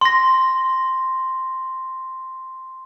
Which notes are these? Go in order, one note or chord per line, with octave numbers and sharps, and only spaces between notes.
C6 A#6